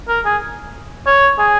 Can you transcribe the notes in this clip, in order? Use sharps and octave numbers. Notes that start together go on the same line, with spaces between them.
A#4
G#4
C#5
G#4